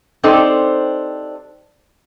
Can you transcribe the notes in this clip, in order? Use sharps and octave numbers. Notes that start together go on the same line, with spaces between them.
C4 D4 D#4 G4 A4 C5